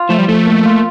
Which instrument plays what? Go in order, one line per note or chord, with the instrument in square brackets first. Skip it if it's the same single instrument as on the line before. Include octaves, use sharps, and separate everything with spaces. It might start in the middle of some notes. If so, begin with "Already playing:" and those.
Already playing: [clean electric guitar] F4
[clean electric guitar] F3 [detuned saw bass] A3
[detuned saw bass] G3
[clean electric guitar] F3 [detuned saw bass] A3
[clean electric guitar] A#3
F4